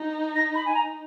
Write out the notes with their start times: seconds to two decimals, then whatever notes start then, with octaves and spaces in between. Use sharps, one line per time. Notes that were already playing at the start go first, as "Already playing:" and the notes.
Already playing: D#4
0.36 A#6
0.55 B5
0.66 G#5
0.74 A#5